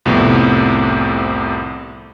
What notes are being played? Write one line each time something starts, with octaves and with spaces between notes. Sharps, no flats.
C2 F2 A2 C3 B3